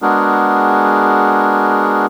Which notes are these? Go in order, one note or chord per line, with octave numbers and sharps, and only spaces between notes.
G#3 B3 D4 F#4 G#4 A#4